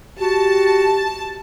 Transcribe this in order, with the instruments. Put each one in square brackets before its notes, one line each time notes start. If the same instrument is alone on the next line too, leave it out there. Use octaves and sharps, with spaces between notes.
[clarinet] F#4 [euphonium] G4 [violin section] A5